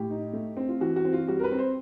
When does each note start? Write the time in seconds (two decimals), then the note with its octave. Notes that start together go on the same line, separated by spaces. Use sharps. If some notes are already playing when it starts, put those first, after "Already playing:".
Already playing: A2 G4
0.10 D#4
0.33 A3
0.57 C4
0.69 F4
0.81 E3 F#4
0.96 F#4
1.05 C4
1.13 F4
1.27 G3 F#4
1.39 A#4
1.44 B4
1.51 C4
1.59 C5